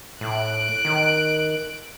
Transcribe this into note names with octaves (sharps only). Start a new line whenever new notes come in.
A2 F#6 D7
D#3